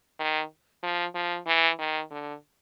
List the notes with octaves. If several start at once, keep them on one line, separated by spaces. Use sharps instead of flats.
D#3
F3
F3
E3
D#3
D3